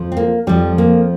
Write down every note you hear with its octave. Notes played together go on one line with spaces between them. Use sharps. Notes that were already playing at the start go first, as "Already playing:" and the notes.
Already playing: F2 F3
C4
A#3
F2 F3 G3
A#3